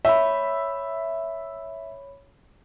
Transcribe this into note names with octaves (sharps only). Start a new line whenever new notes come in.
C#5 E5 B5